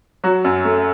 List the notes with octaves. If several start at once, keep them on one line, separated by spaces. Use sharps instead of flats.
F#3 F#4
F#2
A3